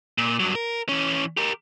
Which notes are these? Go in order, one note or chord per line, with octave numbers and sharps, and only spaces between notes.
A#2
G2 F#3
A#4
E3 C#4
G4 A#4